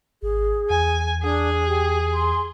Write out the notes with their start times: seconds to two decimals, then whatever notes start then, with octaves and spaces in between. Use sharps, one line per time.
0.22 G#1 G#4
0.70 E2 G#5
1.23 D4 G#4
1.67 G4
2.14 C6